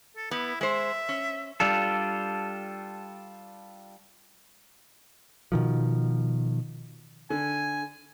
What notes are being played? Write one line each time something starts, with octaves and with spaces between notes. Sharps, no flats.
A4
B3 E4
G#3 C5 E5
C#4
G3 D4 F4 A4
B2 D#3 F3
D3 G#5